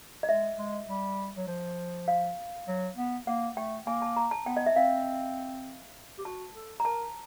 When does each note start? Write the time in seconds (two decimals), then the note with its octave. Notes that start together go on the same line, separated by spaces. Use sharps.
0.23 D#5
0.29 G#3 E5
0.58 G#3
0.88 G3
1.37 F#3
1.48 F3
2.08 F5
2.68 F#3
2.97 B3
3.27 A#3 F#5
3.57 A3 G5
3.87 A#3 G#5
4.02 A5
4.17 A#5
4.31 A5
4.46 B3 G5
4.57 D#5
4.66 E5
4.76 C4 F5
6.19 G4
6.25 F#4 A5
6.55 A4
6.80 A#5
6.85 A#4 A5